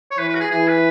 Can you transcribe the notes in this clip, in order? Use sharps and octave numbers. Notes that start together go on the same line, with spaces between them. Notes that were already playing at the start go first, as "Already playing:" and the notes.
C#5
E3 B4
B4
F#4
G#4
E3 G#4
B4